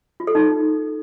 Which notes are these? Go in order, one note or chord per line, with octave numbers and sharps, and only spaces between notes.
F4
A4
D#4